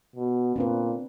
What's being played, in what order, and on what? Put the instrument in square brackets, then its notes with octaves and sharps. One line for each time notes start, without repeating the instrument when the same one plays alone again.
[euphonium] B2
[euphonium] A#2 [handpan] C4 D4 B4